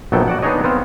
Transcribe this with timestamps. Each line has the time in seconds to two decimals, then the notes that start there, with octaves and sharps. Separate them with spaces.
0.12 A#1 F#3 B3 A4 G5
0.28 F#4 D5 F#5
0.42 B3 D4 D#4 G#4 C#5 D#5
0.64 B3 C4 C5 F5